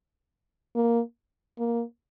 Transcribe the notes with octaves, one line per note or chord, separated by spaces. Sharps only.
A#3
A#3